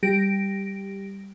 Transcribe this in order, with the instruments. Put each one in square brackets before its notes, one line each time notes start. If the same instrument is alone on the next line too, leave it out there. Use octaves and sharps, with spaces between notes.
[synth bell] G3 G4 A#6 D7